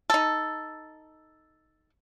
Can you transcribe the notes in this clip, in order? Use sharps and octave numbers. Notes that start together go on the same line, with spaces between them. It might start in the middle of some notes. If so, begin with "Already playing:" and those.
D#4 A4